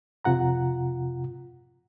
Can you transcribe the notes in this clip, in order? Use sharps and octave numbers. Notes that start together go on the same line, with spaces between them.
F2 C3 F4 F#5 A#5